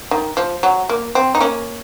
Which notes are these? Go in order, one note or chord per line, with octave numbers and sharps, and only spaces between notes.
D#3
F3
F#3
A#3
C4
D#4
A#3 C#4